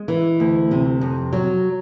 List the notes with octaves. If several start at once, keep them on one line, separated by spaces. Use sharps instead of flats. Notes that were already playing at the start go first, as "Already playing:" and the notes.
Already playing: G#3
E3
D2
C3
F2
F#3